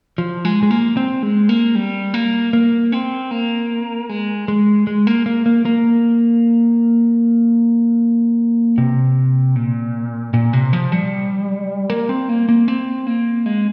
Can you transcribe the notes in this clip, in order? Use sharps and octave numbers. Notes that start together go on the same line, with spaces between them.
F3
G#3
G#3
A#3
C4
G#3
A#3
G3
A#3
A#3
C4
A#3
G#3
G#3
G#3
A#3
A#3
A#3
A#3
C3
A#2
A#2
C3
F3
G3
A#3
C4
A#3
A#3
C4
A#3
G#3